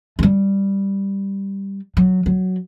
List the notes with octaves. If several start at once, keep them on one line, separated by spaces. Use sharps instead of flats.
A3
G3
F#3
F#3